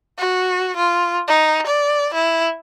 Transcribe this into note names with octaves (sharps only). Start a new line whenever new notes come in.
F#4
F4
D#4
D5
E4